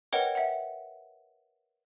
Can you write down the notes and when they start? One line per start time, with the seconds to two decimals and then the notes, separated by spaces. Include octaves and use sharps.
0.13 A#4 B4 C#5 D#5 F#5 G5
0.35 E5 F#5